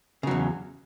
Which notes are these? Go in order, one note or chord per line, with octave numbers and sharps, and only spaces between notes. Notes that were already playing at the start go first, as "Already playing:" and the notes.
E2 C#3 F#3